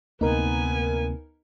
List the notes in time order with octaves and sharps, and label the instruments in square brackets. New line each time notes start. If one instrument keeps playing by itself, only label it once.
[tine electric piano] D2 [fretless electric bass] C3 A#3 [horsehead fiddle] B3 G#5 [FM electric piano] D#4 A#4